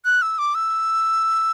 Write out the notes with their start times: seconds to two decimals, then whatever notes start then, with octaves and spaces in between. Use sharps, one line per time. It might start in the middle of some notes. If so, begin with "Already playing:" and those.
0.05 F#6
0.22 E6
0.39 D6
0.55 E6